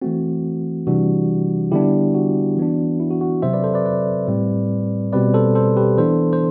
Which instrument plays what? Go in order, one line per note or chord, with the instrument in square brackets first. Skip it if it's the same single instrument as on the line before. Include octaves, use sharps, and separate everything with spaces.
[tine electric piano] E3 A3 C4 F#4
C3 E3 G3 D4 F#4
D3 G3 B3 D4 E4 G4
F#4
E3 B3 D4
E4
F#4
F#4
C3 F#3 C4 C5 E5
B4 D5
A4 C5
B4 D5
B4 D5
A2 G3 C4
B2 G3 C4 B4 D5
A4 C5
A4 C5
G4 B4
E3 B3 D4 A4 C5
C5